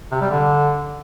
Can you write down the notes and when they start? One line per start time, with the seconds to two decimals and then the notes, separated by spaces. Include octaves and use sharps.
0.11 C3
0.21 G3
0.31 D3